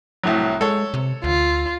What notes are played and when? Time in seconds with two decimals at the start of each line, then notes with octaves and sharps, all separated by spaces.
0.24 C2 A2 F#3
0.61 G#3 A4 C#5
0.94 C3
1.24 D2 F4